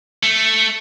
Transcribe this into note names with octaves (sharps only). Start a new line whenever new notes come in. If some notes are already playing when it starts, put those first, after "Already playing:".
A3